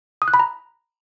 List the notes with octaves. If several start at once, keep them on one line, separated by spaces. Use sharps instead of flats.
D#6
F#6
B5
A#5